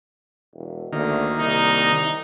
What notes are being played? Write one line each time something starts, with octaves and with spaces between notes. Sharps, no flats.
E1
D2 D#3 A#3
C2 D#4